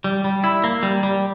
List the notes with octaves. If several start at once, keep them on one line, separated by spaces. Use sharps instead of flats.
G3
G3
E4
A#3
G3
G3